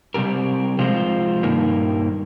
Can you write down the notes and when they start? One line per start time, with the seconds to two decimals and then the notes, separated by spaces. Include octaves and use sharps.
0.14 C3 G3 C4 G4 A#4
0.79 C3 F3 G#3 C4 F4
1.43 G2 D#3 A#3 D#4 A#4